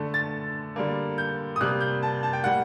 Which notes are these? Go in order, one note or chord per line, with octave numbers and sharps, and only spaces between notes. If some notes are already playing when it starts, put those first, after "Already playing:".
Already playing: D3 A3
A6
D3 G3 A#3
G6
D#6
C3 G3 A#3 F#6
G6
A5
A5
G5
A2 G3 A#3 F#5